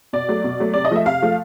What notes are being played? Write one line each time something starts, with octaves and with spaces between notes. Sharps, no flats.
B2 D5
F#3 A3
B2
F#3 A3
C3 D5
D#5
F3 A3 E5
C3 F5
F3 A3